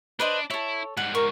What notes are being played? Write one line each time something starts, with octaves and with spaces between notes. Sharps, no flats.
D4 B4 C5 D#5
E4 A4 C#5
G#2 G3 F#5
A#4 C#6